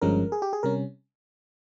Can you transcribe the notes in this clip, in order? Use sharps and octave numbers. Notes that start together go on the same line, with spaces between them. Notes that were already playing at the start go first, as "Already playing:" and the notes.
G1 G2 F3 G#3 C#4 A#4
G#4
G4
G#4
C3 G3 C#4 A#4